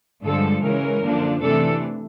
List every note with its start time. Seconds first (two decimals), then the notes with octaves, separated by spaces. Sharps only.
0.23 G2 D3 F3 G#3 A4
0.62 C#3 E3 G#3 C#4 A#4
1.02 F#2 D3 F3 A#3 D4
1.42 C3 E3 A3 D4 A4